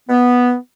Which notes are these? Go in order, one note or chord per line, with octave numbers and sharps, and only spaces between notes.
B3